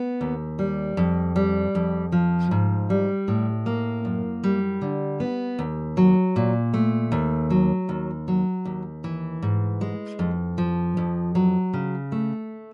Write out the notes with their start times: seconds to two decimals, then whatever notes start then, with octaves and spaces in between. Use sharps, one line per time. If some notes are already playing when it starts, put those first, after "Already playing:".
Already playing: B3
0.21 D#2
0.59 G3
0.97 F2
1.36 G3
1.75 F2
2.12 F3
2.51 G#2
2.90 G3
3.28 A2
3.66 A#3
4.05 F#2
4.44 G3
4.82 D3
5.20 B3
5.59 D#2
5.97 F#3
6.36 A#2
6.74 A3
7.12 D#2
7.50 F#3
7.89 D#2
8.28 F#3
8.65 D#2
9.04 E3
9.42 G#2
9.81 G#3
10.19 F2
10.58 F3
10.97 F2
11.35 F#3
11.73 C#3
12.12 A3